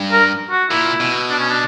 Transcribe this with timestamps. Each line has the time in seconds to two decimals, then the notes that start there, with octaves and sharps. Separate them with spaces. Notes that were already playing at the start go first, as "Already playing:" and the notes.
Already playing: G2
0.12 A#4
0.51 F#4
0.71 A#2 E4
1.00 B2
1.30 D4
1.40 C#4
1.50 D4